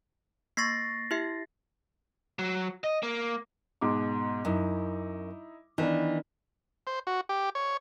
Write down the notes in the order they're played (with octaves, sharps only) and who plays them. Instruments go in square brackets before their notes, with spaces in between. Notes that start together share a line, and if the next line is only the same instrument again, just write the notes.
[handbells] A#3 C#6 [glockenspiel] A6 A#6 C7
[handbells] E4 G4 E5
[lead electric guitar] F#3
D#5
A#3
[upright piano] G#2 B2 D6
[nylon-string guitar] F#2 [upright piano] D#4 E4
[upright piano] D#3 B3 D4 [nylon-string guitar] E3
[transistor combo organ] C5
F#4
G4
C#5